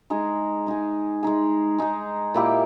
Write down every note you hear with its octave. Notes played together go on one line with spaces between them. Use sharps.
G#3 D#4 G#4
G#3 D#4 G#4
G#3 D#4 G#4
G#3 D#4 G#4
A#2 A#3 E4 G4